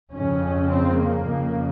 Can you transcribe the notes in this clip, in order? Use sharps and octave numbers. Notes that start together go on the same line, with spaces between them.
F2 C#3 C#4
C4
A#3
F2 C#3